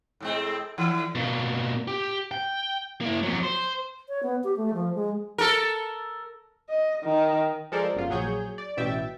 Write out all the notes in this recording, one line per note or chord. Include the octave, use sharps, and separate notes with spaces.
A2 G#3 C4
D3 E3 E4
B2 A#3
G4
G5
A#3 E4
F2 F#3
C5
C#5
B3
G4
A3
F3
G#3
A4 A#4
D#5
D#3
F3 G#3 A4 A#4 C5 D5
G1 F#2 F4
A#1 F#3 G#4 C#5 G6
D5
A1 B2 E5 G5 A6